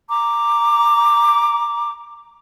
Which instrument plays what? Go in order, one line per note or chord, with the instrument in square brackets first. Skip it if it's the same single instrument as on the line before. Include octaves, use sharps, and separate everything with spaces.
[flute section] A#5 D6